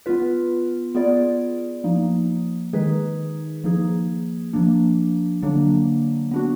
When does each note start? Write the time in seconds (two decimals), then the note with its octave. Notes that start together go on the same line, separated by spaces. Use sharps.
0.06 B3 F4 B4
0.95 B3 F4 G#4 D5
1.84 F3 A#3 D#4
2.73 D#3 G#3 D#4 G#4 B4
3.64 F3 A#3 D#4 G#4
4.53 F3 A#3 D4
5.42 D3 F#3 A#3 D4
6.31 B3 D4 F#4